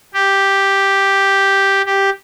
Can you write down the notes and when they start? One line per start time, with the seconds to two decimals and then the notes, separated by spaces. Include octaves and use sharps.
0.14 G4
1.86 G4